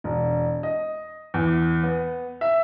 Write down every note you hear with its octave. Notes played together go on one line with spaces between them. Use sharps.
E1
D#5
E2
B3
E5